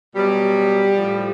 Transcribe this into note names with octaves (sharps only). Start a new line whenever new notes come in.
B2 F#3 G3
A2 F3